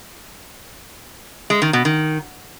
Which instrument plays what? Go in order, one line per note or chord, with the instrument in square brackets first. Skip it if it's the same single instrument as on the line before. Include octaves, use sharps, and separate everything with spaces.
[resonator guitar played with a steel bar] G#3
D#3
B2
D#3